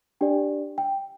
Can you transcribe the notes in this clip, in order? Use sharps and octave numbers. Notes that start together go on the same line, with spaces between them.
D4 G4 D5 G5
G5